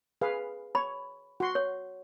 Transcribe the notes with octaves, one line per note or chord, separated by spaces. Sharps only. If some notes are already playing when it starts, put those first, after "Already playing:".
G#4 B4 F5
C#5 B5
F#4 C6
C#5